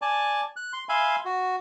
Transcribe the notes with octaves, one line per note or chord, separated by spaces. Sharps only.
D5 G#5 A5
F#6
C6
E5 F5 G#5 B5 C6
F#4